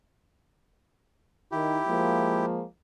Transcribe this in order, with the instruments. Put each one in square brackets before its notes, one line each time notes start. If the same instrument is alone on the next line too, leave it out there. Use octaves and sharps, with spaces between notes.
[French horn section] D#3 [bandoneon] E4 G4
[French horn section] F3 G#3 A#3